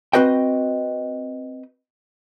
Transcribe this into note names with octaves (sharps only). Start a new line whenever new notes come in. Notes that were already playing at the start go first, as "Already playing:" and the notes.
C4 F#4 B4 D#5 G5